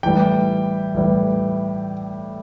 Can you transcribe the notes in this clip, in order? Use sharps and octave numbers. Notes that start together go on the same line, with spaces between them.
A2 E3 G3 G5
A2 E3 G3